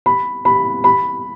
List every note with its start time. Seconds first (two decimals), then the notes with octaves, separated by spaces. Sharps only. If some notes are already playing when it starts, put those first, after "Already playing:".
0.06 B5
0.45 B5
0.84 B5